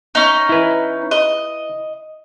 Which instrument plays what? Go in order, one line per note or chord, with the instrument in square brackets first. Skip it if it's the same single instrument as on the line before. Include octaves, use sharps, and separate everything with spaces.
[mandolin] C#4 D#4
[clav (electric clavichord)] E4 B4
[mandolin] D#5